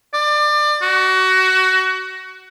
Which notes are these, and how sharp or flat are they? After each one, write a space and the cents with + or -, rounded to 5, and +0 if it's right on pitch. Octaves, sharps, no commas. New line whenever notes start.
D5 +25
F#4 +25